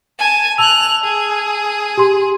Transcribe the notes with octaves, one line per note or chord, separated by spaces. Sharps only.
G#5 A5
A5 E6 F#6 F7
G#4
G4 C6